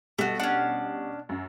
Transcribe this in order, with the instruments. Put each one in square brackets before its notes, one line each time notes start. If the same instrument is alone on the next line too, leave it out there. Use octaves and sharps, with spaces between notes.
[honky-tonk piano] B2 G3 [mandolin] A3 F#4
[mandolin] C#4 D4 [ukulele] F#5
[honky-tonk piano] F#2